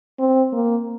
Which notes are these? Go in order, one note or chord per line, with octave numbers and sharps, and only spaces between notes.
C4
A#3